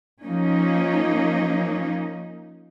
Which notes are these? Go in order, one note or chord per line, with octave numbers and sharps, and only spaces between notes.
F3 A#3 C#4 D#4